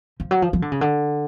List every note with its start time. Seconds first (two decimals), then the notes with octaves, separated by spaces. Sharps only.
0.20 F3
0.31 F#3
0.42 F3
0.53 F3
0.62 D3
0.72 C#3
0.81 D3